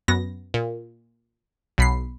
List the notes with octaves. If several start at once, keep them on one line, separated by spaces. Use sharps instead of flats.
F#2 B3 A#6
A#2
B1 B5 C7